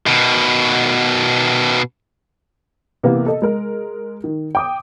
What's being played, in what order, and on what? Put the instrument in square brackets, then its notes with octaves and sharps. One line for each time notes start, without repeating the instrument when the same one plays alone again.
[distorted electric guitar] B2 D#3
[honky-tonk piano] C3 E3 A#3 B3 G4 A#4
A4 D#5
G#3 A#4
D#3
G5 D6 D#6